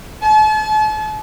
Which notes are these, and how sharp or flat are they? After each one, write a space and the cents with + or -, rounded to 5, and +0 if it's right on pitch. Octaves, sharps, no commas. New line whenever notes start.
A5 -40